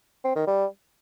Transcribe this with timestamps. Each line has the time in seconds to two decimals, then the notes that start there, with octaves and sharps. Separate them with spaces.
0.24 C4
0.36 D#3
0.47 G3